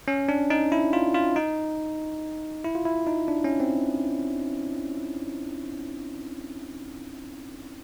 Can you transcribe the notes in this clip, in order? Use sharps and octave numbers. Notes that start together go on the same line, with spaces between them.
C#4
D4
D#4
E4
F4
F4
D#4
E4
F4
E4
D#4
D4
C#4
C4